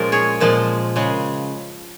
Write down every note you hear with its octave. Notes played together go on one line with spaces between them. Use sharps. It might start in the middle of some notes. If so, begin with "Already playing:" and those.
Already playing: A#2 F3 G#3 C#4 F4 A#4
G#4 C#5
A#2 F3 G#3
C#3 G#3